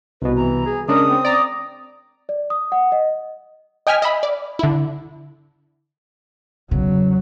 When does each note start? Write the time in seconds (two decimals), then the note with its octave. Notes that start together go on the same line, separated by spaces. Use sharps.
0.22 C2 B2 B4
0.36 E3 A#5
0.66 G#4
0.88 C#3 G#3 D4 A#4 D#6
1.08 C4
1.25 D5 A#5
2.29 D5
2.50 D#6
2.72 F#5
2.92 D#5
3.87 D#5 G5 G#5 F6 B6
4.02 D#5 E5 B5
4.23 D5
4.59 D3 E4
6.71 E2 C#3 F#3